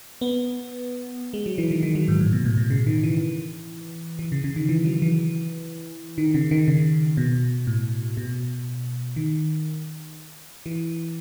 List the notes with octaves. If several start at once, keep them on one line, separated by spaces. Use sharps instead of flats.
B3
G#3
F#3
E3
D#3
D#3
F#3
G#2
A2
B2
A2
B2
C#3
D#3
E3
E3
C#3
C#3
D#3
E3
F#3
E3
D#3
C#3
D#3
C#3
B2
A2
B2
D#3
E3